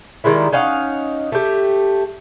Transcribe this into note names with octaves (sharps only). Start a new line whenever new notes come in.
D#3 G3 G#3 E4
C#4 D#4 F5 F#5
A3 G4